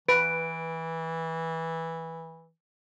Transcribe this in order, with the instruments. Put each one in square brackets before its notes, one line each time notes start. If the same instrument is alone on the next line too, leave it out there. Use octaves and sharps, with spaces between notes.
[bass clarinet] E3 [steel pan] B4 [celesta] D7